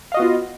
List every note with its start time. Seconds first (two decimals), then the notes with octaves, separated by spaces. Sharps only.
0.12 F5
0.14 D#5
0.17 F#4
0.20 B3
0.22 F4